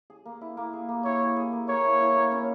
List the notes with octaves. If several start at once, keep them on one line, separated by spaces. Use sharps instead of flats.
G#4
A#3
E4
A#3
G#4
A#3
E4 C#5
G#4
G#4
A#3
A#3 C#5
E4
E4
A#3
C#4